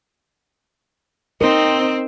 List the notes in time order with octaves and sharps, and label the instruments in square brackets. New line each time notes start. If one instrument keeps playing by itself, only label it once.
[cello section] C4 [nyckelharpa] D#4 [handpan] A#4